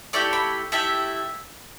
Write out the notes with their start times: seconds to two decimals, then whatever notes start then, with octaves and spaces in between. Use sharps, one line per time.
0.13 A3 E4 G4 D5
0.33 B5
0.72 A3 E4 G4 E5